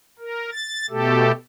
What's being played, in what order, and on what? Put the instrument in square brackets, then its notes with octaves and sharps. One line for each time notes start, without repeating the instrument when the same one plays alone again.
[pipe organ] A#4
A6
B2 A3 G4 A4